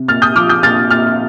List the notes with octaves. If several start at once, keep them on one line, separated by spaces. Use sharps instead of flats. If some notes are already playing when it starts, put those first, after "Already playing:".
Already playing: C3
A#2 F6 A6
D#6 G6
F3 D6 F6
D#6 G6
A#2 F6 A6
A#2 F6 A6